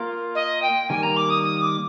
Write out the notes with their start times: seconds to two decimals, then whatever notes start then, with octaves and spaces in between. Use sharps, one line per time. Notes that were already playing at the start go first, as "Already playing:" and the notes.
Already playing: A#3 F4 A#4
0.35 D#5
0.62 G5
0.89 D#3 G3 A#3 G#5
1.03 A#5
1.17 D6
1.30 D#6
1.43 D#6
1.61 D6